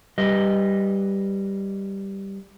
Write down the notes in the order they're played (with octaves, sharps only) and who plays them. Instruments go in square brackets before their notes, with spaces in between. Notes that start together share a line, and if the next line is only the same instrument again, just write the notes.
[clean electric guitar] G3 B4 D#5